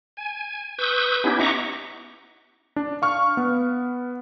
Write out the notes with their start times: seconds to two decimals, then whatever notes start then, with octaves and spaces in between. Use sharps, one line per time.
0.17 G#5
0.78 B4 C#6 D#6 E6 G6
1.24 B3 C#4 D#4 E4 G4
1.40 D#5 E5 F#5 A#5 C#6 D6
2.76 D4
3.02 F5 C#6 F6
3.37 B3